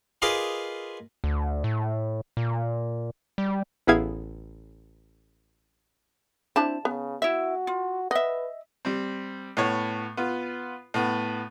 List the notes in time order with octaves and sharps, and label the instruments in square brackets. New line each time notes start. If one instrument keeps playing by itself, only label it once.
[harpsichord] F4 G#4 A#4 B4 D#5 D6
[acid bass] D2
A2
A#2
G3
[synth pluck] A1 B3 E4 G#4 F5 G#6
[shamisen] C4 D4 E4 [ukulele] A5
[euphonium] C#3 [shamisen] B3
[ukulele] E4 E5 [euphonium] F#4
[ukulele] F4
[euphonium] B4 [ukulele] D#5 E5 [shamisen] F#5
[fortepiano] G3 C4
A2 B3 C#5
B3 F4
A2 B3